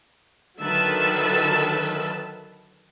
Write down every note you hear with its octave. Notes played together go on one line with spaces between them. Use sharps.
D3 D#3 F#3 B4 E5 A5